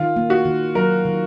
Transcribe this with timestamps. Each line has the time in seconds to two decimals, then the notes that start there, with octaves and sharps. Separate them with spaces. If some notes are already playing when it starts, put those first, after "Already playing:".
Already playing: D#3 F4
0.16 A#3
0.30 F#4
0.45 D#3
0.75 F#3 A#4
1.05 D#3